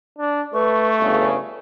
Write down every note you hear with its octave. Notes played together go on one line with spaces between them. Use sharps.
D4
A3 B4 C#6
G1 C#3